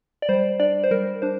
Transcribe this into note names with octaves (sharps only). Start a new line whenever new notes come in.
D5
G3 C5
D4 D5
C5
G3 A#4
D4 C5